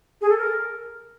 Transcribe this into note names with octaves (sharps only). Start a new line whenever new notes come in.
G#4
A4
A#4